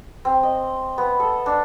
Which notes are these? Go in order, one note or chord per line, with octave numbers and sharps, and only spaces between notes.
C4
D#5
B3
A4
D4